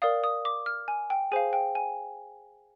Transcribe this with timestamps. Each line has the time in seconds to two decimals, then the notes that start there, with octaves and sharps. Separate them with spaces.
0.02 A#4 D5 F5 D#6
0.24 D#6
0.45 D6
0.66 F6
0.88 G#5
1.10 G5
1.32 G#4 C5 F5 G#5
1.53 G5
1.75 G#5